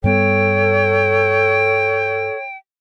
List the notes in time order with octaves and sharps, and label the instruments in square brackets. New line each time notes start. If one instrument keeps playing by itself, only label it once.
[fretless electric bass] G2 G3 B3 [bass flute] A4 [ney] C#5 [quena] G5